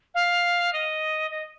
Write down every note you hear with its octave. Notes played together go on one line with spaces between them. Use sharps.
F5
D#5
D#5